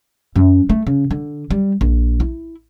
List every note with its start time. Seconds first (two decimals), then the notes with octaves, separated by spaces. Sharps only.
0.36 F#2
0.70 A3
0.87 C#3
1.11 D3
1.50 G3
1.81 A#1
2.20 E4